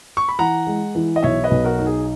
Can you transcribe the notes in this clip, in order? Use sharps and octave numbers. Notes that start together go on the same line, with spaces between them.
C#6
B5
E3 F#5 A#5
G#3
E3
D#5
B1 C#5 E5
B4 D#5
B1
F#4 A#4
D#4
G#4